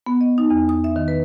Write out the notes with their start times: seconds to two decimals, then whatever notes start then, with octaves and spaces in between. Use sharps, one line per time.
0.06 B3
0.21 D#5
0.38 D#4
0.51 E2
0.69 D#6
0.84 E5
0.96 D#3
1.08 B4